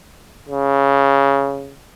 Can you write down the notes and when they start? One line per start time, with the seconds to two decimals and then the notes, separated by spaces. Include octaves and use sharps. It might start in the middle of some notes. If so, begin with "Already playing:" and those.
0.49 C#3